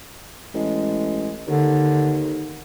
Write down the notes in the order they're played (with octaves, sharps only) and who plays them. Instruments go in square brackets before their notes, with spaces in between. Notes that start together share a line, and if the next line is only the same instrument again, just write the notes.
[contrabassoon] A1 [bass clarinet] G#3
[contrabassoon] D#2 [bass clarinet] D3